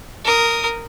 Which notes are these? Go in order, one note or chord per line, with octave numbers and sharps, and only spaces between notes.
A#4 D#6